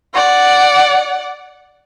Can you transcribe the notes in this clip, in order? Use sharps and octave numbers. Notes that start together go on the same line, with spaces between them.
D5 F#5